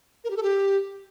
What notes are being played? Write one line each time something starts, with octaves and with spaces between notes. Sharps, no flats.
A#4
G4
A4
G4